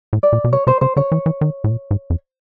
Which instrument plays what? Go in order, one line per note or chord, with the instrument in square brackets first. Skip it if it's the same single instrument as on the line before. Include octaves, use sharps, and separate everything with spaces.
[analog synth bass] A2
[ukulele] D5
[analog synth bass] A#2
B2
[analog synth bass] C3 [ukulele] C#5
[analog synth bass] C3 [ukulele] C5
[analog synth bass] C#3 [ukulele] C5
[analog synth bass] D3 [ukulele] C#5
[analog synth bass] E3
E3
D#3
A2
A#2
G#2
F2